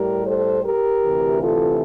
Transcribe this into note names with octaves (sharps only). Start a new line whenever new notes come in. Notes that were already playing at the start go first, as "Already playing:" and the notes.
Already playing: A2 G3 G4 A#4
A4 C5
G4 A#4
D2 C3 E3
F4 A4